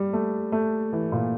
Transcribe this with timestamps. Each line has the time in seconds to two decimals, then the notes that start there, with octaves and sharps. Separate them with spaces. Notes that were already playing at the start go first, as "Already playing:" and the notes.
Already playing: G3
0.13 A3
0.52 A3
0.93 E3
1.12 A#2